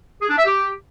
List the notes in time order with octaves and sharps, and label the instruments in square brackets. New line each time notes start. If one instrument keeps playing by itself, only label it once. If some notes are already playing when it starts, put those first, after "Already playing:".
[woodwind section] G#4
D4
E5
G4